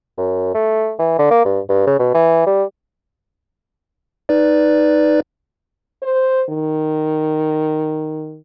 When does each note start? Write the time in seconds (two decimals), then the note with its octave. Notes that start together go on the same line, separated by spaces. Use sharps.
0.17 F#2
0.54 A3
0.99 E3
1.19 D3
1.30 A#3
1.45 G2
1.69 G2
1.87 C#3
1.99 B2
2.14 E3
2.46 G3
4.29 D#4 B4 D5
6.02 C5
6.49 D#3